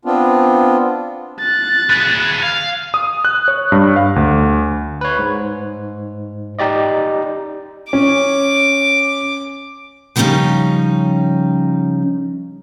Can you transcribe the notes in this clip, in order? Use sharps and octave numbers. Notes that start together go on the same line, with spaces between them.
B3 C4 D4 F4
F#6 A6
G#4 B4
F5
D#6
F#6
C#5
G2
F5
D2
B4 C#5
G#2
D#4 G4 D5 D#5
C#4 D6
C#3 F3 G3 C4 C#4 D#4